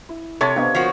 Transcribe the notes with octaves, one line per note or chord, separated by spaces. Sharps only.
E4
C3 A4 C#5 A5 C6 A6
B3 D4 G4 C5 D#5 F5
F3 C4 F#4 A#4